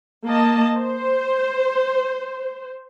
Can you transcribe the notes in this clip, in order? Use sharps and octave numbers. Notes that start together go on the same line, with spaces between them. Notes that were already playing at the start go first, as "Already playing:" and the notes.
A#3 D#5 A5
C5